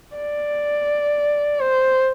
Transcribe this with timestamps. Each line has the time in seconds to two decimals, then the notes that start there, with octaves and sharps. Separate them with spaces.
0.17 D5
1.61 C5